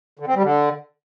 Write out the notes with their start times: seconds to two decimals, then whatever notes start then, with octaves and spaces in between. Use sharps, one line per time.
0.19 D3
0.27 C4
0.35 G3
0.43 D3